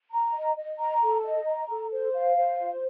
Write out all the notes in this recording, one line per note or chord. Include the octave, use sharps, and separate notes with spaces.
A#5
D#5
D#5
A#5
A4
D#5
A#5
A4
C5
F5
C5
F4